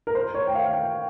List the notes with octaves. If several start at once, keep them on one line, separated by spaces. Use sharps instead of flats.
A#4
C5
C#5
G5
F5
F5
G5